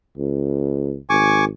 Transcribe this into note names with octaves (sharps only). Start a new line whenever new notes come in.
C#2
G#1 G#5 C#6 D6